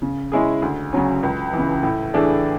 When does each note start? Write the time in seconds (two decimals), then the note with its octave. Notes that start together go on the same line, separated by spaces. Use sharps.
0.02 C#3
0.32 G#3 C#4 E4 G#4
0.62 D2
0.93 C#3 F#3 C#4
1.23 C#2
1.53 C#3 E3
1.83 A2
2.14 E3 A3 D4 G#4